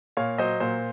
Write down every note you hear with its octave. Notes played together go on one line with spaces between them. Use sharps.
A#2 C#5 F5
F#3 C5 D#5
A#2 C5